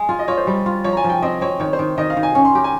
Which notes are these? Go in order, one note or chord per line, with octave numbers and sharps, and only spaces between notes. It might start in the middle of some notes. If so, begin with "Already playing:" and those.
Already playing: G#3
F4 G#5
D#5
F4 C#5
C5
G3
F4
F3 C#5
A#5
G#5
F3
G5
C4 D#5
C4 C#5
D#3 C#5
C5
D#3
D#3 D#5
F5
D#3
G#5
C#4
C6
G4 A#5
G#5